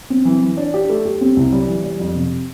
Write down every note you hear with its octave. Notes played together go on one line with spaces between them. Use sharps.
C4
E3
E3
D4
G4
A3
G4
C4
C2
G3
E3
G3
F2
C3